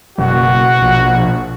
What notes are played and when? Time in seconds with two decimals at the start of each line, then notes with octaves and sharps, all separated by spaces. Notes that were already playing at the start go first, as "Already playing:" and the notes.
0.18 F#1 B2 F#4
0.81 A#1